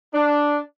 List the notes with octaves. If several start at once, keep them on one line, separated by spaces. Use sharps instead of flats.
D4